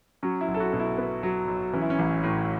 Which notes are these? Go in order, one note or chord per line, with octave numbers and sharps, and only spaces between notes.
F#3 C#4
E4
B1
A4
F#4
B2
E4
B3
F#3
B1
E3 C#4
E4
C#4
A1
A2